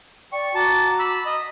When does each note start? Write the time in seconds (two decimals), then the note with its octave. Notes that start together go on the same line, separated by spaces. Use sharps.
0.33 D5 G5 C#6
0.55 F#4 A5 A#5 D6
0.99 B5 E6
1.26 D#5